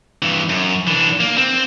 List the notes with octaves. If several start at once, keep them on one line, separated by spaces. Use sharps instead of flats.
G2 E3
F#2
E3 D4
A#3
C4